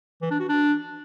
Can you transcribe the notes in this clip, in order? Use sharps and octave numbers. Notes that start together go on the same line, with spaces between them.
E3
D4
F#4
D4